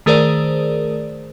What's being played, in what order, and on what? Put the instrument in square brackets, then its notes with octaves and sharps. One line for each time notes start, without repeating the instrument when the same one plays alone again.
[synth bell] D#3 A3 G#4 A#4 C5 D5